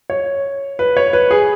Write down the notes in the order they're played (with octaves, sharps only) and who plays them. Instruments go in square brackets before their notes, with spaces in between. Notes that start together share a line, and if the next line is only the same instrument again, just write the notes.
[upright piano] C#5
B4
C#5
B4
G#4